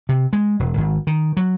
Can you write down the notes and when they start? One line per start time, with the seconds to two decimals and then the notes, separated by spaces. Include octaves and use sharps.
0.09 C3
0.33 G#3
0.59 E1
0.77 G#1
1.07 D#3
1.37 F#3